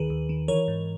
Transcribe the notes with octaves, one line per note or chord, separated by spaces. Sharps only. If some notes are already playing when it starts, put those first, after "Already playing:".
Already playing: D#2 D#3 G#4 B4
D#2
D#3
E3 A#4 C#5
G#2